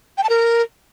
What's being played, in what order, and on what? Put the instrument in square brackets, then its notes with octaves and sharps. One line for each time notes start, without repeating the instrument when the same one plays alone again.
[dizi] G5
A5
A#4